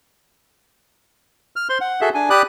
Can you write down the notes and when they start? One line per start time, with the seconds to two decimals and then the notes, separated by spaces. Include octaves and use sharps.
1.56 F6
1.69 C5 C6
1.81 F#5
2.01 F#4 G#4 A4 E5
2.15 D4 G#5
2.30 G4 D5 B5 D6 D#6 F#6